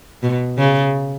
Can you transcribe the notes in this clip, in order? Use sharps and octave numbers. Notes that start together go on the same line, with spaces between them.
B2
C#3